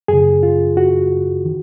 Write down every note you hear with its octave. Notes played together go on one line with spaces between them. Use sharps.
F#2 C#3 G#4
F4
F#4
D#3